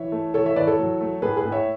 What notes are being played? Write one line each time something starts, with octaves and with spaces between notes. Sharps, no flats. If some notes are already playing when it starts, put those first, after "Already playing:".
Already playing: E3 C#5 E5
A3
E3 A4 C#5
C#5 E5
E3 B4 D5
A4 C#5
F#3
A3
A2 G#4 B4
G#4 B4
A2
C#5 E5